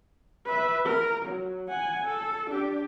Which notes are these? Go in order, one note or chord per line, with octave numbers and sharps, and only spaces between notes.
B4 E5
A#4
F#3
F#5 G#5
A4
D4 G4